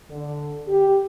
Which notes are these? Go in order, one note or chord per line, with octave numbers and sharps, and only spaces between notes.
D3
G4